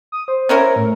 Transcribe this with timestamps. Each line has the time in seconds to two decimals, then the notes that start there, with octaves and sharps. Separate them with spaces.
0.12 D#6
0.28 C5
0.49 C#4 E4 A#4
0.76 A2